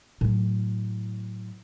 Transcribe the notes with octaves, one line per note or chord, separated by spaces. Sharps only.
A2 F#3